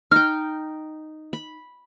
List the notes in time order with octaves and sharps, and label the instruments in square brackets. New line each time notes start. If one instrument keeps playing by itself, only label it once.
[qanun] D#4 G5 [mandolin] F6
[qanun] B5